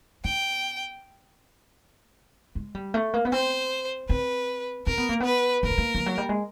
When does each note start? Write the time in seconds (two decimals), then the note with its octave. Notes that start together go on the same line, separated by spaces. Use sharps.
0.25 B3 G5
2.55 G#3
2.75 G3
2.94 A3
3.14 A#3
3.25 B3
3.32 C4 C5
4.09 C4 B4
4.86 C4 A#4
4.98 B3
5.09 A#3
5.20 B3 B4
5.63 A#3 A#4
5.70 B3
5.78 A#3
5.95 F3
6.06 F#3
6.18 G3
6.29 G#3